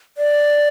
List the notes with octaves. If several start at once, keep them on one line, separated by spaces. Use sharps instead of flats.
D5